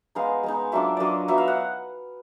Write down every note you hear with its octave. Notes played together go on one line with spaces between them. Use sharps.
G#3 B3 D#4 F5
G#3 B3 D#4
F#3 A#3 D4 F4 E5
F#3 A#3 D4 F4 D5 D#5
F#3 B3 D#4 E5
F5
F#5